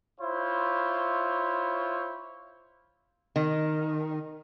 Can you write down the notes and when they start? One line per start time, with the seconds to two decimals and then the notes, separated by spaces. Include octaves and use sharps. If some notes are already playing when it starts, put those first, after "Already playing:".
0.21 E4 F4 C5 C#5
3.36 D#3